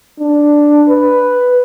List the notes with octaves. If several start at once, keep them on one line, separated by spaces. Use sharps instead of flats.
D4
B4